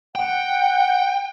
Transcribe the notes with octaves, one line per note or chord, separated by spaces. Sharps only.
F#5 G5